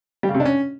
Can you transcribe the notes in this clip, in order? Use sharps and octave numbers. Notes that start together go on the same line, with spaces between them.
G3
C#3
C3
D4
C#4